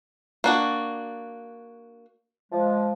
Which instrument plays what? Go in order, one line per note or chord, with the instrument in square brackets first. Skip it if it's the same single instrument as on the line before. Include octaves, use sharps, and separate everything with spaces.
[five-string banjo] A#3 D4 F#4
[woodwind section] F3 G#3